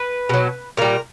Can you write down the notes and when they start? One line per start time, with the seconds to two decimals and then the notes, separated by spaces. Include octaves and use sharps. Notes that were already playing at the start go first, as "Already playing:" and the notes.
Already playing: B4
0.29 B2 F#3
0.77 A#2 G3 A#4